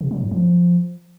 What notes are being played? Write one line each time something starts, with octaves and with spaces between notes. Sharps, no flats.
C3
F#3
G2
F3